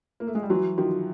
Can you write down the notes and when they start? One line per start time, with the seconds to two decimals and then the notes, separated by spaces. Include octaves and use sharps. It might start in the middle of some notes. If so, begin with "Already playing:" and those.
0.20 A#3
0.27 A3
0.35 G#3
0.43 G3
0.50 E3 F#3 F#4
0.78 D#3 F3 F#4